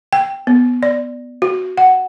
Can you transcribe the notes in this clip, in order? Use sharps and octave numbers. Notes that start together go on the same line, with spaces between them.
G5
B3
D5
F#4
F#5